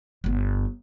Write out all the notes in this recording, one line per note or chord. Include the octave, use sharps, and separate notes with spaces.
G1 B3